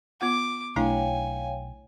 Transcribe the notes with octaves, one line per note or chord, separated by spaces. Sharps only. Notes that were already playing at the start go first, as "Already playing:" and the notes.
B3 F4 F#5 D6
B1 A3 D4 E4 C#5 F5 G5 G#5